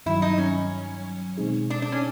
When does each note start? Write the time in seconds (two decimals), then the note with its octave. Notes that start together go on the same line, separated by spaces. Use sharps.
0.06 G2 D#3 F#3 E4
0.22 D#4
0.38 C#4
1.37 B2 G#3 C4 D#4 G#4
1.70 D4
1.82 D4
1.92 C#4